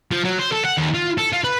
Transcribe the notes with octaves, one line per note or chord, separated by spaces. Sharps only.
F3
F#3
C5
A4
F#5
D#2
F4
A4
F4
B4